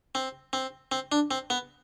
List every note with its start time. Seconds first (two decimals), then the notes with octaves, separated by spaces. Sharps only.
0.15 C4
0.53 C4
0.92 C4
1.12 D4
1.31 C4
1.50 B3